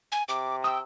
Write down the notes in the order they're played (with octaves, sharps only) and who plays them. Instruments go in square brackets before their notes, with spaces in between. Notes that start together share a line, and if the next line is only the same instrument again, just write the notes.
[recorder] G#5
[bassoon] C3 [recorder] D6
[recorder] G5 [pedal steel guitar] D#6 E6